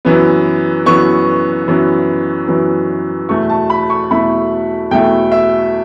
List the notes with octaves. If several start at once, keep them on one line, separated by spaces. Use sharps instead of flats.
F#2 E3 B3
F#2 E3 B3 C#6
F#2 E3 B3
F#2 E3 B3
E2 B2 A3 E4 C#6
A5
B5
C#6
E2 B2 A3 E4 B5
E2 B2 A3 E4 G5
E5